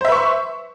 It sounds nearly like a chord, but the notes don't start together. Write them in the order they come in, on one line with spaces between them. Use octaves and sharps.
C5 E5 B4 C#6 C6